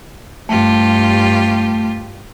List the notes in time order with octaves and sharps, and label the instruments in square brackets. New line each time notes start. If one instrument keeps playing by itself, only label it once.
[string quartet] G2 F4 G4 [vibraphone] A3